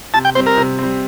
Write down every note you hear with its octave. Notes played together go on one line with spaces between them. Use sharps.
C3 A5
G5
G3 C4 C5
A#4
C3
G3 C4